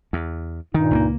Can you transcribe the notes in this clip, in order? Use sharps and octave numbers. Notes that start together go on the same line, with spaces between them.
E2
G2 A#2 D#3 D#4
C#2 A3 A#3